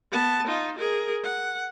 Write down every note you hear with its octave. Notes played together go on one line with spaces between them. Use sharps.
B3 A5
D#4 F4
G#4 A#4
F#5